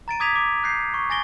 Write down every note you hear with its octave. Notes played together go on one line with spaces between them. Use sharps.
A#5 A6 D7 D#7
D6 D#6 G#6 B6 D#7 F7
D6 D7
F#6 G6 A#6 C7 C#7
C#6
G#5 A6 A#6 D7 G7